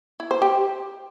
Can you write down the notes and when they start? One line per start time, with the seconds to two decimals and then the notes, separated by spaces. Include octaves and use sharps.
0.20 E4
0.31 C5
0.42 G4